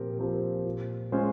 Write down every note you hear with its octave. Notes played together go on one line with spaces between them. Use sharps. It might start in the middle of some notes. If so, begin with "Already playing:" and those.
Already playing: A#2 F3 C4 G4 A#4
F3 C4 G4 A#4
A#2
G#3 C#4 F4 C5